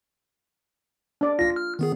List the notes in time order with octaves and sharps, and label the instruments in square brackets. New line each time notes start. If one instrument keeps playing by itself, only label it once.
[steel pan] D4 D5
[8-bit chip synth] B1 A#6 [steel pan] F4
[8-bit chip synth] F6
D#3 B3 G#4